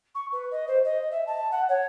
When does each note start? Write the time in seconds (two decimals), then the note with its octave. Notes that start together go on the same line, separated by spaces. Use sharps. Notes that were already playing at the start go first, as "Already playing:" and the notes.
0.15 C#6
0.32 B4
0.51 D#5
0.67 C5
0.84 D#5
1.11 E5
1.27 A5
1.51 F#5
1.69 C#5